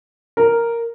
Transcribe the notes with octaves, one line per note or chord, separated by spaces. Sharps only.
A#4